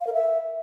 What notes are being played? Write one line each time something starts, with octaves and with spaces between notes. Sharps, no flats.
F5
A#4
E5